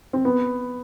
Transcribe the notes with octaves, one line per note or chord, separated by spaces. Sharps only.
C4
B3